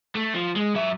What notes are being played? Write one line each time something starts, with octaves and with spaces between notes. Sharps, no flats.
A3
F3
G#3
F#3 E5